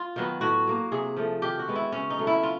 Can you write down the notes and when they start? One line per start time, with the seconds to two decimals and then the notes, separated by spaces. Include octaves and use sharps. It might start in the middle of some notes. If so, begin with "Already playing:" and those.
Already playing: F4
0.16 D#3 F#3 B3
0.41 A2 F#4
0.67 F#3 A#3
0.92 C3 G#4
1.17 F3 A3
1.42 D#3 G4
1.59 F#4
1.67 G#3 B3
1.75 E4
1.92 C#3 C#4
2.10 D#4
2.19 F#3 A3
2.27 E4
2.43 F4